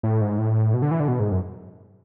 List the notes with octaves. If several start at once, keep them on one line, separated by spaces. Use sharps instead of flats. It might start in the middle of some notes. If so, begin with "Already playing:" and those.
A2
G#2
A2
B2
D3
E3
D3
B2
G#2
F#2